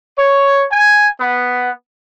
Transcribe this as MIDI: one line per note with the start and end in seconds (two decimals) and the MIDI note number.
0.18 0.65 73
0.71 1.08 80
1.20 1.70 59